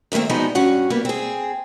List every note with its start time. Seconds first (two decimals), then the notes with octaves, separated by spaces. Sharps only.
0.12 G2 D#3 A3 A#3 C4
0.29 F3 G3 G#3 B3 D#4 F#4
0.55 G2 C#4 F#4 F#5
0.90 G3 A#3 B3
1.05 C4 G#4